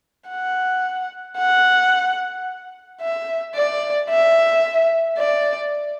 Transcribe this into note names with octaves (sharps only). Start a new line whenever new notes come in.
F#5
F#5
E5
D5
E5
D5